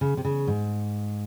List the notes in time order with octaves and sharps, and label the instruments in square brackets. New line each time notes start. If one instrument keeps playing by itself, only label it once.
[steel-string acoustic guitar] C#3
C3
C#3
G#2